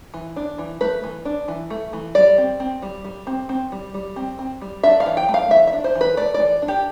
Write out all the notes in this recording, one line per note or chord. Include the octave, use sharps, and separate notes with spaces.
E3
D4
E3
A3 B4
E3
D4
E3
A3
E3
G3 D5
C4
C4
G3
G3
C4
C4
G3
G3
C4
C4
G3
D4 E5
F5
E3
G5
A3
F5
E3 E5
E5
D4
C5
E3
B4
A3 D5
D5
E3
D4
G4